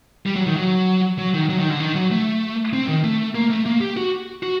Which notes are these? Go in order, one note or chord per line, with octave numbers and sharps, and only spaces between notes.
G3
F#3
D#3
F#3
F#3
D#3
F#3
D#3
D3
D#3
F#3
A3
C4
D#3
A3
A#3
A3
A#3
G4
F#4
F#4